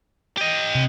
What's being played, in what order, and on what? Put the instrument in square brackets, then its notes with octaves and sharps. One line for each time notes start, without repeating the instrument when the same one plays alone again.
[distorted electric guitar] G4 D#5
[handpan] C3